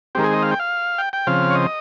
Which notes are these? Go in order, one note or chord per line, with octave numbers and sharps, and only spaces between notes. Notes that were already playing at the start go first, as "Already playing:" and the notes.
D#3 G#3 C4 G4 A#4
G#4
D#5
F5
G5
F5
G5
G5
C#3 F3 C4 F5
C#5
D#5